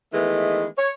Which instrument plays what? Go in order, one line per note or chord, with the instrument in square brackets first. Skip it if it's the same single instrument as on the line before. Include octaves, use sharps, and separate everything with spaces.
[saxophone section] D#3 E3 G#3 A3 B3
C#5